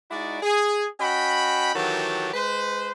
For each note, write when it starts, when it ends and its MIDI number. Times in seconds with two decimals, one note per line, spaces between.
0.11 0.40 56
0.11 0.40 63
0.11 0.40 64
0.11 0.40 66
0.11 0.40 74
0.43 0.87 68
1.00 1.73 61
1.00 1.73 66
1.00 1.73 75
1.00 1.73 79
1.00 1.73 83
1.75 2.29 51
1.75 2.29 52
1.75 2.29 54
1.75 2.29 66
1.75 2.29 67
1.75 2.29 69
2.34 2.92 56
2.34 2.92 71
2.34 2.92 72